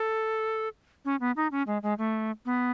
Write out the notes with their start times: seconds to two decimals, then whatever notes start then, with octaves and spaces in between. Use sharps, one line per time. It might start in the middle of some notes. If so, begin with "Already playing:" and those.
Already playing: A4
1.05 C#4
1.20 B3
1.36 D#4
1.52 C#4
1.67 G#3
1.83 G#3
1.98 A3
2.45 B3